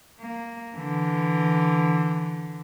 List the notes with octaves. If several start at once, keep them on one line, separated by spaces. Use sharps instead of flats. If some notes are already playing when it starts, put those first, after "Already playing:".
A#3
D3 E3